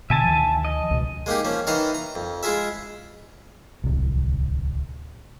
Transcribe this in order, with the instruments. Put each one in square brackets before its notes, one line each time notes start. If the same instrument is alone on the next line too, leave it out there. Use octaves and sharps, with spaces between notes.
[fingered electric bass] B2 D3 [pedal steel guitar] E5 G#5 A5
[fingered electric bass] D2 D#3 F3
[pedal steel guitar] D#5
[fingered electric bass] C#2 B2
[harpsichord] G#3 A#3 D#4 G4
F3 A#3 C#4
D#3 E3 D#4 D#5 F5 A#5
A#5
F2
G#3 E4 F4 G#4 E5
[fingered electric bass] D1 C2